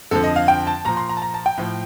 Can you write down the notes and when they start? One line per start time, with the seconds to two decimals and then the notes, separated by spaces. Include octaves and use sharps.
0.11 F2 D3 F3 A4
0.24 D#5
0.36 F5
0.48 G5
0.67 A5
0.85 A#2 F3 A#5
0.97 C6
1.09 A#5
1.17 A5
1.22 A#5
1.34 A5
1.46 G5
1.57 A2 F3